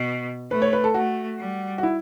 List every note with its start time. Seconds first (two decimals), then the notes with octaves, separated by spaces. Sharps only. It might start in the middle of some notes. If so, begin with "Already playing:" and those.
Already playing: B2
0.51 A3 B4
0.62 C#5
0.73 B4
0.84 A4
0.94 A3 F#4
1.39 G3
1.78 F#4
1.83 E4